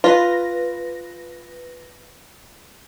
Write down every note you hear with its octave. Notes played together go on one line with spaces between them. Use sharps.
F4 B4 A#6